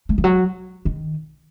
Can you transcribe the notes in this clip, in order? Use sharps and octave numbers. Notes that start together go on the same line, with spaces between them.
A3
E3
F#3
D#3